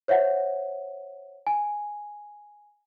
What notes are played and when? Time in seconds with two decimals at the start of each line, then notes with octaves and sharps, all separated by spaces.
0.08 C5 C#5 E5 F#5
1.47 G#5